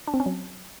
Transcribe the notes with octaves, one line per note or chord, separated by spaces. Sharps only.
D4
C4
C#4
F#3